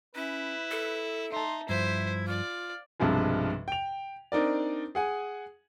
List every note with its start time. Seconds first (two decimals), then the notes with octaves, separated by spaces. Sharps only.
0.15 C#4 E4 B4
0.71 A4
1.32 D#4 E5 A5 C6
1.69 G2 F3 E4 C5 E5
2.27 F4 D5 F5
3.00 B1 G2 C3 F3 G#3
3.68 G5 F7
4.32 C4 D4 D#4 A#4 D5
4.95 G#4 F#5 G#5